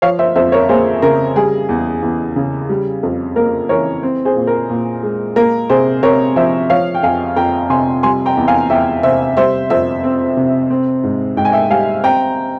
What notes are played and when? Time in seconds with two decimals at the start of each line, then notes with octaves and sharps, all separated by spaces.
0.02 F3 C#5 F5
0.19 C5 E5
0.36 F2 C5 E5
0.52 A#4 C#5
0.69 A#3 G#4 C5
1.02 C#3 A#4
1.36 G3 G#4
1.69 E2
2.02 E2
2.36 C#3
2.69 G3
3.03 F2
3.36 A#3 A#4
3.69 E3 A#4 C#5
4.03 C4
4.25 G#4 C5
4.36 A#2
4.47 A#4
4.70 A#2
5.03 G#3
5.36 A#3 A#4
5.70 C3 G#4 C5
6.03 C3 A#4 C#5
6.36 F3 C5 E5
6.70 F3 C#5 F5
6.94 G5
7.03 F2 F5 G#5
7.36 F2 G5 A#5
7.70 C3 G#5 C6
8.03 G3 G#5 C6
8.26 G5 A#5
8.37 E2
8.48 F5 G#5
8.70 E2 E5 G5
9.03 C3 C5 E5
9.37 G3 C5 E5
9.70 F2 C5 E5
10.04 C4
10.37 C3
10.70 C4
11.03 G#2
11.37 G#2 G5
11.45 G#5
11.53 E5 G5
11.70 G3 F5 G#5
12.04 C4 G5 A#5